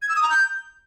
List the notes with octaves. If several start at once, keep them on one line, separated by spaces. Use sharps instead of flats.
G#6
E6
D#6
A#5
G6